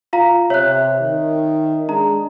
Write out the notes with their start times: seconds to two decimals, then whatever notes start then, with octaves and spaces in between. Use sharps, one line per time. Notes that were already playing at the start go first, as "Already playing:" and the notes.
0.13 F4 F5 A#5
0.50 C3 C#5 E5 F#6
1.01 D#3
1.89 G#3 D4 A#5